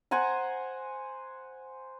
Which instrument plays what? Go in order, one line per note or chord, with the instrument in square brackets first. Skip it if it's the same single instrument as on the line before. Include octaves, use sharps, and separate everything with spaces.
[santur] C5 F#5 G#5 A#5